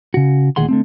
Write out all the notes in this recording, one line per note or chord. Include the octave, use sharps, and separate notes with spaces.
C#3 F#4
D2 A#2 D#3 G#4 F#5 C6
D3 A3 C4